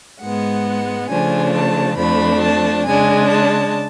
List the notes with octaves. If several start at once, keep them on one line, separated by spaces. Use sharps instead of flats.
G#2 G#3 B3 F#5
C#3 F3 A3 D4 G#5
A5
F2 F3 A3 D4 B5
A5
C#3 G#3 D4 G#5
A5